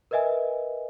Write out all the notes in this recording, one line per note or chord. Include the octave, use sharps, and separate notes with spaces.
A#4 B4 D#5 E5 G#5